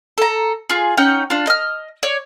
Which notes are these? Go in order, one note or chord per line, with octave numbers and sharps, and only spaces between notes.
A4 A#5
F4 G#4
C#4 D#4 F#5 G5
D4 F4
D#5 F6
C#5 D5